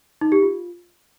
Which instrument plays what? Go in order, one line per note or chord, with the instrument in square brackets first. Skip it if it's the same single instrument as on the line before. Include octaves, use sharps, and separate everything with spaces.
[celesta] D#4
G4
F4